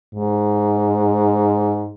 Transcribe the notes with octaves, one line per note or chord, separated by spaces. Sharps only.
G#2